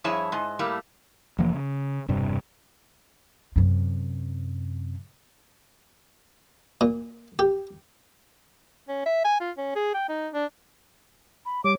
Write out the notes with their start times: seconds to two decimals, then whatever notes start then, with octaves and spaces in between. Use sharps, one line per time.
0.04 G2 F3 E4 G#4 C#5 E5
0.32 G#2 G#3 D#5
0.59 A2 G3 A3 A#3
1.38 F1 E3 F3 A#3
1.54 C#3
2.08 E1 G2 C3 G3
3.56 F#2 C3
6.81 A#2
7.39 G4
8.88 C#4
9.06 E5
9.25 G#5
9.40 F4
9.57 C#4
9.75 G#4
9.94 G5
10.09 D#4
10.33 D4
11.45 B5
11.64 G3 C#5 D6